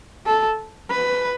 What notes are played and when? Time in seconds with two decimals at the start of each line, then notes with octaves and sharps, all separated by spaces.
0.26 A4
0.90 B4